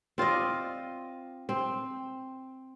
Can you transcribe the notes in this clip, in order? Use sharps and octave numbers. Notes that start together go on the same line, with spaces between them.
C4 F4 D5 D#5
C4